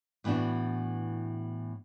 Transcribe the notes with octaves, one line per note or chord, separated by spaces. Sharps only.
A2 E3 B3 D4 F#4